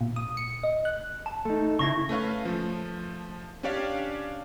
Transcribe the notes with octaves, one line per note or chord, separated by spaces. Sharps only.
A#2
D#6
C#7
D#5
F#6
A5
A3 D#4
C#3 E4 C#6 A#6
A3 C#4 B4 F5
F3 A3
C#4 D4 G4 C#5 D5 F5